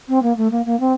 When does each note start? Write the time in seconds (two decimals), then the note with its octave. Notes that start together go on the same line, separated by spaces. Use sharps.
0.08 C4
0.22 A#3
0.37 A3
0.51 A#3
0.65 A#3
0.80 C4